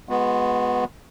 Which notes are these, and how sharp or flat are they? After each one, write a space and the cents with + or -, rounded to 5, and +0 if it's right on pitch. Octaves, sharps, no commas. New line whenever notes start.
G#3 +0 B3 +0 F#4 -35